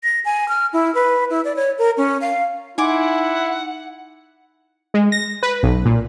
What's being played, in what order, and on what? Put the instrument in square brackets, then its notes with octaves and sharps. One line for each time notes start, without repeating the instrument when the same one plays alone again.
[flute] A#6
G#5
F6
E4
B4
E4
D5
C#5
A#4
C#4
F5
[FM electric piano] D#4 [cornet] E4 [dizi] F#5 [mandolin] G#5 C6 D6
[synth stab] G#3
A#6
B4
B1
A#2